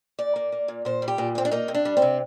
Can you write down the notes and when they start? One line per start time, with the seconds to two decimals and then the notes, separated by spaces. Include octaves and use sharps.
0.19 A#2 D5
0.36 A#3
0.52 A#3
0.68 A#2
0.85 A#2 C5
1.02 G3
1.08 G4
1.18 A#2
1.35 A#3 C4
1.45 D4
1.51 A#3 D#4
1.68 C3
1.74 D4
1.85 G3
1.97 C4
2.02 C3